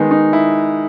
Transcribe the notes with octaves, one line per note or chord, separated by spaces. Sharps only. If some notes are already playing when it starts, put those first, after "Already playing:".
Already playing: D#3 G#3 B3 D#4
D#4
E4